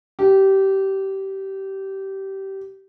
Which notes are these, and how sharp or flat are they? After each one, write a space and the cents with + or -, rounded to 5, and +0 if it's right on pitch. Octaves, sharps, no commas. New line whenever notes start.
G4 -20